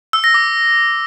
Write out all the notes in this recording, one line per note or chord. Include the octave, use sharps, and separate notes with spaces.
E6
A#6
D6